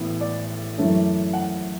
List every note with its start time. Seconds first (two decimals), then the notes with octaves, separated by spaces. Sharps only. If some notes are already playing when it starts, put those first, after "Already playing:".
Already playing: A1 A2 E3 B3
0.21 D5
0.78 F#2 E3 A3 C#4
1.33 F#5